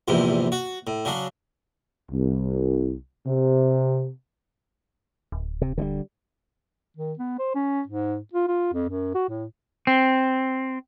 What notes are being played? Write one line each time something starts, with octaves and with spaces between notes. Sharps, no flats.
A#1 E2 G#2 C3
F#4
A2
C#3 F#3 D4
C2
C3
D1
C3
D3 F#3 G3
D#3
B3
C5
C#4
G#2
F4
F4
F2
F#2
F#4
A2
C4